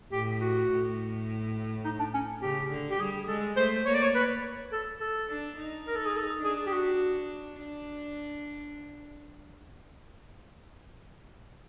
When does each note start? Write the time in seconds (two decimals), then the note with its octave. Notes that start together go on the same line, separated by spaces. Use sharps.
0.12 A2 G4
0.41 F#4
0.70 A2
1.84 D#4
1.99 D4
2.14 C#4
2.42 C#3 G4
2.71 D3
2.91 G4
2.99 G3 G#4
3.28 G#3 A4
3.57 A3 C5
3.86 A#3 C#5
3.94 D5
4.02 C#5
4.15 B4
4.72 A4
5.00 A4
5.29 D4
5.58 D#4
5.87 A#4
5.96 A4
6.06 G#4
6.16 A4
6.44 D4 G#4
6.67 G4
6.73 F#4
7.59 D4